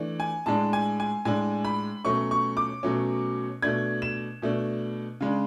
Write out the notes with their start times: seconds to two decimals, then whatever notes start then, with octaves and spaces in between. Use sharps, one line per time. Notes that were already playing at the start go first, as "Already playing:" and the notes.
Already playing: E3 A3 D4
0.20 G#5
0.46 A2 G#3 D4 A5
0.73 G#5
1.00 G#5
1.25 A2 G#3 D4 G#5
1.64 B5
2.05 B2 F#3 A3 C#4 C#6
2.31 C#6
2.57 D6
2.83 B2 F#3 A3 C#4
3.62 B2 A3 D4 G#6
4.02 E7
4.42 B2 A3 D4
5.20 C#3 G#3 D4